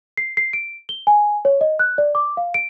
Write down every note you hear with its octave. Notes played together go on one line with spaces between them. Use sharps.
C7
C7
D7
G7
G#5
C#5
D#5
F#6
D5
D6
F5
D7